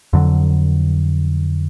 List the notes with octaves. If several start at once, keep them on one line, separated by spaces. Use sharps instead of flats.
F2 D3 F#3